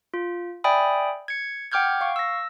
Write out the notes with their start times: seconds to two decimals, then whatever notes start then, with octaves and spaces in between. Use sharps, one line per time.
0.14 F4
0.64 D5 E5 G5 G#5 B5 D#6
1.28 G#6 C#7
1.72 F#5 G5 D6 F6 G6 G#6
2.01 F5 C#6
2.16 E6 A#6